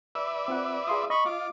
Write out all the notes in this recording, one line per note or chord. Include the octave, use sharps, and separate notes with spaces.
B4 D5 E5 E6
C4 F4 F#5
F4 G#4 C6 D#6
D#5 B5 C#6
F4 D6